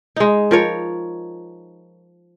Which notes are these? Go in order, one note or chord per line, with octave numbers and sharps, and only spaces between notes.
G#3 D#4
F3 A#4 C#5